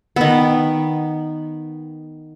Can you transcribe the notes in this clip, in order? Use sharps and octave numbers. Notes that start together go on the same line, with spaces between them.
D#3 B3